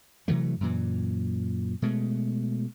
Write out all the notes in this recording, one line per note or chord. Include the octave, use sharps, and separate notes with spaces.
C3 E3 F#3 A3
F#2 A#2 E3
B2 G#3 A3